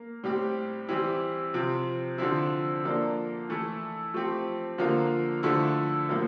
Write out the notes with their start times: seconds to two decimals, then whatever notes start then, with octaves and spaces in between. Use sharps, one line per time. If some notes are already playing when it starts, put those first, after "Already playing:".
Already playing: A#3
0.24 A2 G3 C4 G4
0.89 E3 G3 C4 E4 G4
1.54 C3 F3 C4
2.18 D3 F3 C4 E4
2.84 F3 A#3 D4 A4
3.49 E3 A3 E4 A4
4.14 F3 A3 C4 G4
4.78 D3 F3 A#3 F4
5.43 D3 F3 A3 E4
6.09 A2 F3 A#3